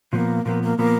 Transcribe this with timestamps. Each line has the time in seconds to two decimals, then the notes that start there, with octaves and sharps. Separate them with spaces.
0.12 A#2 F3 A#3 B3
0.45 A#2 F3 A#3 B3
0.63 A#3
0.78 A#2 F3 A#3 B3